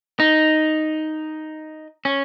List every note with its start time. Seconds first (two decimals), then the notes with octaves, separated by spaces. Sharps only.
0.20 D#4
2.05 C#4